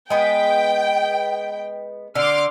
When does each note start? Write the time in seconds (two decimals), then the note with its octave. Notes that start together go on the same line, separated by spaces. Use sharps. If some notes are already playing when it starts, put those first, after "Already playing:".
0.10 G#3 B3 G5
2.15 D3 C6 D6 F6